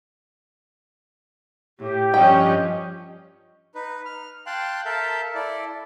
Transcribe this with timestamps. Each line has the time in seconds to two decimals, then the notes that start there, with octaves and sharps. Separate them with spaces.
1.79 A2 G4
2.14 G2 F3 C#4 D#5 G5
3.75 D#4 B4
4.06 F6
4.46 F5 G5 A5 C6 F#6
4.85 A4 A#4 E5 F5 A5 G6
5.35 E4 A4 D5